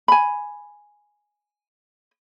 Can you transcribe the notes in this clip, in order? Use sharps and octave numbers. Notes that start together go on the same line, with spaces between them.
G#5 B5